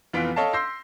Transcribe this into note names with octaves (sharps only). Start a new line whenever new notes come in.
F1 E3 B3 F4 B6 D7
A4 C#5 D#5 F5 A5
C6 E6 G6 A#6 C7